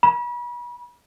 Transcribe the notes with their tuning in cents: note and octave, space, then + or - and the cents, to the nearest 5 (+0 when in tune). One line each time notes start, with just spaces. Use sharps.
B5 -35